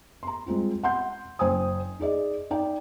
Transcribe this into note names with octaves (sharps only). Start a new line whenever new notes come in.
A#5 C6
G3 G#3 C4 F4
F#5 C6 G6
F#1 C5 G5 G#5 D#6
D#4 G#4 D5 D#5
D#4 D5 G5